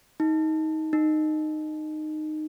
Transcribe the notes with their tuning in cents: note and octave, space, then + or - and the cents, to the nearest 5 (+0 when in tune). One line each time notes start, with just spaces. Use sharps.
D#4 +20
D#4 -15